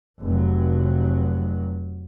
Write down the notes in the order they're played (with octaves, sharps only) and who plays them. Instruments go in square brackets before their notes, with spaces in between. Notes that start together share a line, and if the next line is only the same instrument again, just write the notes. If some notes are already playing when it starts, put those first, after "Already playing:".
[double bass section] F1 F#3